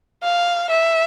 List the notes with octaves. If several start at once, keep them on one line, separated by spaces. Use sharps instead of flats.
F5
E5